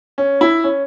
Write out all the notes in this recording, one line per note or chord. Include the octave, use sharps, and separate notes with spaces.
C#4
E4
C#4